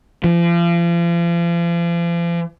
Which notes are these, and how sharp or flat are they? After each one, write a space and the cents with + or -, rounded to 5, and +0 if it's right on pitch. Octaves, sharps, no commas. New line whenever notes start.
F3 -40